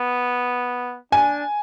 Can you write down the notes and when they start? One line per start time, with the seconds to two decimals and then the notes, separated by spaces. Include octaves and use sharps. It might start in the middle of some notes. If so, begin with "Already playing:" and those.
Already playing: B3
1.12 D4 G#5